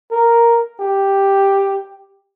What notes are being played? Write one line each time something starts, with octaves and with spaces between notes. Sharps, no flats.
A#4
G4